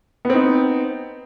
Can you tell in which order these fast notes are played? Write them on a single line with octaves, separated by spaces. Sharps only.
B3 C4 D#4